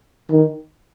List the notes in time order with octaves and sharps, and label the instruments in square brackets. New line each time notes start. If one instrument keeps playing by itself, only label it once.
[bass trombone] D#3